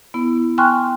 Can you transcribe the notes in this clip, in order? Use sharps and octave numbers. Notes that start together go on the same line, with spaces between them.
B3 E4
G5 G#5 C6 C#6 F6 F#6